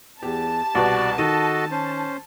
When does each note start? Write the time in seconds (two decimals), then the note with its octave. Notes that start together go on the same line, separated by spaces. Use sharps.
0.23 E2 G4 A5
0.75 C2 B2 F#4 D5
1.18 D#3 F#4 A4 D#5 D#7
1.71 C#4 C5